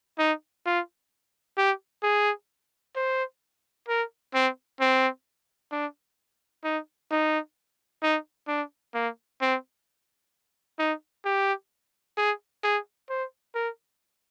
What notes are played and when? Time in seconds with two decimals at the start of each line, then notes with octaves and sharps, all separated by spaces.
0.18 D#4
0.66 F4
1.57 G4
2.03 G#4
2.96 C5
3.88 A#4
4.34 C4
4.80 C4
5.72 D4
6.64 D#4
7.11 D#4
8.02 D#4
8.48 D4
8.94 A#3
9.41 C4
10.79 D#4
11.25 G4
12.17 G#4
12.63 G#4
13.09 C5
13.55 A#4